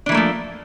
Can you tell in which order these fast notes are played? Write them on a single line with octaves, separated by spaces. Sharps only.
D4 E3 A#3 A3 F3